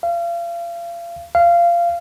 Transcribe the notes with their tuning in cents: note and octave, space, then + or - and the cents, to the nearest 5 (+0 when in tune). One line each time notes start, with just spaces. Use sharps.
F5 -35
F5 -20